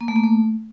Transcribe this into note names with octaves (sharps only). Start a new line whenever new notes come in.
A#3
A3
A#3
A3